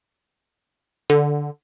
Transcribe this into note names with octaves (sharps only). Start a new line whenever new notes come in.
D3